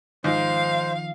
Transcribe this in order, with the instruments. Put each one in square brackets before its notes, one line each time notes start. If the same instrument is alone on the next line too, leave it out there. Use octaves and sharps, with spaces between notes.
[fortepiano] G#2 [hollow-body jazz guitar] D#3 F3 D#4 [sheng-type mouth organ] C5 [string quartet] F5